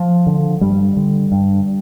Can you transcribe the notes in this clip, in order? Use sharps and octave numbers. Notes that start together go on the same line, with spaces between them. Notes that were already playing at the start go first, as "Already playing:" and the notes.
Already playing: F3
D3
G2 G3
D3
G2